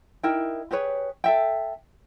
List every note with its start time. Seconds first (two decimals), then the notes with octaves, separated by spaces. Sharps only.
0.23 D#4 E4 A#4 G5
0.71 G4 G#4 B4 C#5
1.24 A4 E5 G5